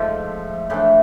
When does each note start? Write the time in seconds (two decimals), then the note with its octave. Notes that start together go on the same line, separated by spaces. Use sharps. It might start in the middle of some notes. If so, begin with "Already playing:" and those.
Already playing: G#2 F3 A3
0.70 A2 E3 A3 D4